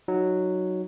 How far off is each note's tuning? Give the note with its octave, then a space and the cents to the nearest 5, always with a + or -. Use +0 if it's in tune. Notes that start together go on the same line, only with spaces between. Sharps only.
F#3 +0 D#4 +0